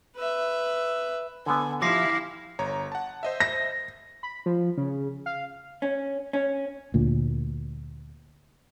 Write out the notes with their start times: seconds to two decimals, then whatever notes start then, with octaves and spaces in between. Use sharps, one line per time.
0.17 B4 E5
1.46 D3 B3 G#5
1.82 F3 E4 G4 F5 D6 A#6 C7
2.59 G1 C#5 A#5
2.92 F#5 A5
3.23 C5 D#5 E5
3.40 A#6
4.23 B5
4.46 F3
4.77 C#3
5.26 F5
5.82 C#4
6.33 C#4
6.94 D2 A#2